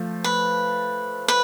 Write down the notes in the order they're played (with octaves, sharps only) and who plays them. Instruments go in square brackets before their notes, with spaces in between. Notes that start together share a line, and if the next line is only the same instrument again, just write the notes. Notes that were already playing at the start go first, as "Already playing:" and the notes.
Already playing: [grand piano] F3 A3
[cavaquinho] B4
B4